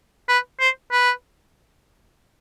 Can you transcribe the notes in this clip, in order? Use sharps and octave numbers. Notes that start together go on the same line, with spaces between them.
B4
C5
B4